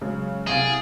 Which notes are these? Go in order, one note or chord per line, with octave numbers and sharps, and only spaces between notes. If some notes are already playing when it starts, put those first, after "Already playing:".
C#3 F#3 G#3 C#4
C2 G#4 F5 A6 D7 F#7 G7